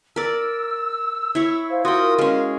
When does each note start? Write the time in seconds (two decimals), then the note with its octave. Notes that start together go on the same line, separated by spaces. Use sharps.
0.16 A#4 D5 E6
1.35 E4 C#5
1.69 C5 F5
1.85 F4 F#4 A#4 G5 D#6
2.18 G#3 C#4 F5